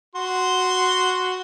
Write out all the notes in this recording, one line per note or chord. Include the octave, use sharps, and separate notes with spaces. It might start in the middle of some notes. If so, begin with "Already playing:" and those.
F#4 C6